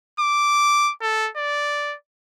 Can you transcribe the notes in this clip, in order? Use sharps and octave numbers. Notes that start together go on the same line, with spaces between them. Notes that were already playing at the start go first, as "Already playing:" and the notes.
D6
A4
D5